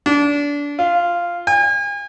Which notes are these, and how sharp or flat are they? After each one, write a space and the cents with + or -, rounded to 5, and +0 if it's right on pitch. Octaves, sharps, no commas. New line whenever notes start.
D4 -25
F4 -5
G#5 -40